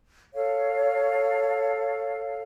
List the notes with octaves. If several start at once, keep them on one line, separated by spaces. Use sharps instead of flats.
A4 C#5 F5